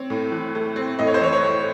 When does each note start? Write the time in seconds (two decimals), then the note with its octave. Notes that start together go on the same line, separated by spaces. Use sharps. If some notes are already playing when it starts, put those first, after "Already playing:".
Already playing: C4 C#5
0.10 A2
0.32 E3
0.55 A3
0.76 C4
0.99 A2 D#5
1.07 C#5
1.14 C5
1.21 E3 C#5
1.32 C#5
1.43 A3